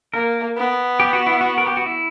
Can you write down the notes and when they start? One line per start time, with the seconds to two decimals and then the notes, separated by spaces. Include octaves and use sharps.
0.14 A#3 A#4
0.57 B3
1.00 G4
1.13 F#4
1.27 E4
1.41 F#4
1.58 A#4
1.67 G4
1.77 F#4
1.86 E4